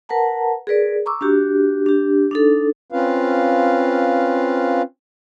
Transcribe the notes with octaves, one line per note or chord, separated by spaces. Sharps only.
A#4 B4 F#5 A5 A#5
G#4 A#4 B4 D5
A#5 C#6 D6 E6
D4 F#4 G4
D4 G4
D4 D#4 A4
C4 C#4 F4 B4 F5